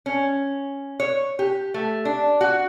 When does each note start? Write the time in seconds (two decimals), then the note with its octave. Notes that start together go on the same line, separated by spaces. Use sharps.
0.06 C#4
1.00 C#5
1.39 G4
1.74 A3
2.05 D4
2.41 F#4